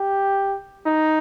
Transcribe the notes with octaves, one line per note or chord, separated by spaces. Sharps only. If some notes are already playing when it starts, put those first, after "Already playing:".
Already playing: G4
D#4